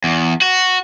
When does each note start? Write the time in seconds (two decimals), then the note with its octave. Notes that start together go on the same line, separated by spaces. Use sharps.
0.04 E2
0.42 F#4